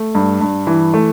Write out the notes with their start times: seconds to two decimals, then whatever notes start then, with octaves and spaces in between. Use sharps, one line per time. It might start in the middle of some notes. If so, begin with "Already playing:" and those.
Already playing: A3
0.15 G2
0.41 G2
0.67 E3
0.94 A3